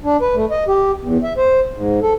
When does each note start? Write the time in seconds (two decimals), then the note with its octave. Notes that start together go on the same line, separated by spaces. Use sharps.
0.04 D4
0.22 B4
0.35 A3
0.51 D#5
0.68 G4
1.01 E2
1.23 E5
1.37 C5
1.75 G#2
2.02 A4